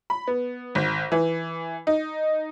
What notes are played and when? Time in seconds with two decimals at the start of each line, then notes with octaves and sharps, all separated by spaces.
0.10 B5
0.28 B3
0.75 G#1
1.12 E3
1.87 D#4